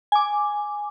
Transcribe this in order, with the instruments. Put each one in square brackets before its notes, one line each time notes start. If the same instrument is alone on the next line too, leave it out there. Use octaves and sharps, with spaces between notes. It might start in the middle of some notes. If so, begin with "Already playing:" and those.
[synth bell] G#5 D6